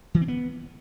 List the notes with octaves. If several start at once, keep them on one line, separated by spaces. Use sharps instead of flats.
E3
C4
B3